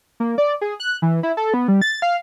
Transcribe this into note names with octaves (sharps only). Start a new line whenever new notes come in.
A#3
D5
G#4
F#6
E3
E4
A4
B3
G3
A6
F5